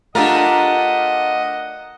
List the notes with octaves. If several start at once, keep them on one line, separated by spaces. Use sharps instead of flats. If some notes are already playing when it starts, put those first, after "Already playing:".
A3 D4 F4 G4 A#4 D#5 F#5